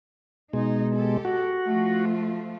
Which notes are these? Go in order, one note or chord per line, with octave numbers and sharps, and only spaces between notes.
B2 G#3 D#4
G4 A4
F#4
F3 A3 F4